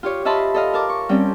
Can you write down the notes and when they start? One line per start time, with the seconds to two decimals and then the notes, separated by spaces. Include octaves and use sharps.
0.03 F4 G4 C#5
0.25 F4 D#5 E5 A5 B5 C6
0.54 A4 D#5 F5
0.74 A#4 A5 D6
0.89 C#6
1.09 G3 C4 C#4 G5